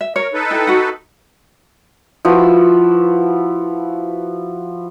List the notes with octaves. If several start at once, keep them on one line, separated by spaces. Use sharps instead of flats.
E5
A#4 C#5
D#4 A4 B4
E4 G5
F#4 F#5
F3 E4 F#4 B4